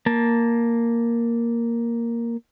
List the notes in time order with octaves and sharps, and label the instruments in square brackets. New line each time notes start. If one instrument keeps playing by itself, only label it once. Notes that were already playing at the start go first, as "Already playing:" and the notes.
[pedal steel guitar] A#3 A5